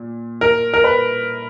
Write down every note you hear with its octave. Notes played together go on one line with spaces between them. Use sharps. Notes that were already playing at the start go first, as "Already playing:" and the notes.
Already playing: A#2
A#4
A#4
B4